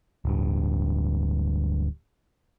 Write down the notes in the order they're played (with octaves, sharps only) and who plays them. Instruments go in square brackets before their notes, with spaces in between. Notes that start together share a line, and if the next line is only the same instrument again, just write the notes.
[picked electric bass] D1 G2